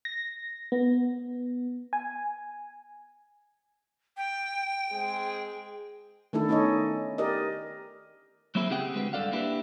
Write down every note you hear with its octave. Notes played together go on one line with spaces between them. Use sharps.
A#6
B3
G#5
G5
G#3 C4 G#4
D#3 A3 D4 E4 A4
B3 C#4 D#4 A4 C#5 D#5
G4 A#4 D5 D#5
F#3 A#3 C4 E4 G#4 C5
C#3 C4 G4 G#4 F#5 G5
D3 G#3 C4 F#4 B4
G2 F3 A4 D5 F5 F#5
A#3 B3 D4 E4 G4 B4